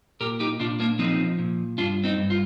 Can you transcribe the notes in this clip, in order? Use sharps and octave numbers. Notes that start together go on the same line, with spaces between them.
A#2 G4 A#4
D#4 G4
A#2 D4 F4
A#3 D4
F3 C4 D#4
A#2
G2 D4 F4
C4 D#4
G2
F4